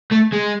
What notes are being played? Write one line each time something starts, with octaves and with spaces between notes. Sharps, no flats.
A3
G#3